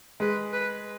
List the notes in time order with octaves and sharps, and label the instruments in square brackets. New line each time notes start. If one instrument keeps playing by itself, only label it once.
[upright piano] G#3 [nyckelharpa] B4
[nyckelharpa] B4